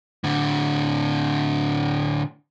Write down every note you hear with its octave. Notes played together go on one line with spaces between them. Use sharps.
A2 D3